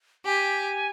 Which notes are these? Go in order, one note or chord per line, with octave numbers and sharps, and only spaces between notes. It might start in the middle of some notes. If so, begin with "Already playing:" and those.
G4 G#5